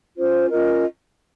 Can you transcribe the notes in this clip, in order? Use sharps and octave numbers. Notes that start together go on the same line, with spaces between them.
C#4 F4 C5
C#4 F4 A#4 D#5